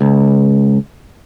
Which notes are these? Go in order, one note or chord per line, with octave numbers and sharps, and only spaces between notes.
C#2